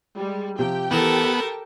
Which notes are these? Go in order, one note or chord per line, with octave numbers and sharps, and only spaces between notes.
G3 G#3
C3 F3 G4 G5
E3 B3 A4 A#4 A5
B5